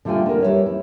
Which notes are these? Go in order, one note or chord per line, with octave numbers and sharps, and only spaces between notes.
D3 G3 A3 F4 G5 G#5
D3 A#4
G3 A#4 B4 C#5 E5
E4